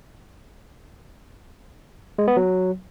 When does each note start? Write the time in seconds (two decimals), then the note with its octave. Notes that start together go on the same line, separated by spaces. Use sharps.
2.19 G#3
2.28 B3
2.37 F#3